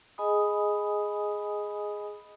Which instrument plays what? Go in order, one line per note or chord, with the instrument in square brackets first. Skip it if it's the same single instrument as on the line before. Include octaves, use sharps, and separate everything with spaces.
[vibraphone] G#4 D#5 G#5 B5 D#6